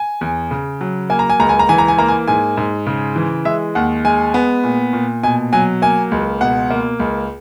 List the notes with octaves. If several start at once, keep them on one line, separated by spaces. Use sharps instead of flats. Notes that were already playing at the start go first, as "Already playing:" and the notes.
Already playing: G#5
E2
C#3
F#3
A#3 G#5
A#5
G#5
C#2 A#5
G#5
A#5
E3 G#5
A#5
G#5
A#3 A#5
G#5
G#2 G#5
G#2
C#3
E3
G#3 E5
D#2 F#5
G#3 G#5
B3
A#2
A#2
B2 G#5
F#3 G#5
A#3 G#5
C#2
B2 F#5
A#3
C#2